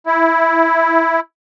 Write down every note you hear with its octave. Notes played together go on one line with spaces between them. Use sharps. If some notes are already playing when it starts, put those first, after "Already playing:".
E4